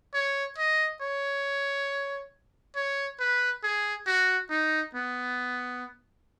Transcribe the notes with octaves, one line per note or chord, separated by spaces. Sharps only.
C#5
D#5
C#5
C#5
B4
G#4
F#4
D#4
B3